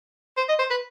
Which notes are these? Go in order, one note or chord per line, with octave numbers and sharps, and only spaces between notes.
C5
D#5
C5
B4